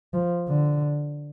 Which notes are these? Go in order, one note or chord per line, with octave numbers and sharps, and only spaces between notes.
F3
D3